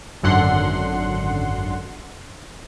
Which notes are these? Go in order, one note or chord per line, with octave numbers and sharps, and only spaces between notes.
G#1 F#2 D3 F#5 C6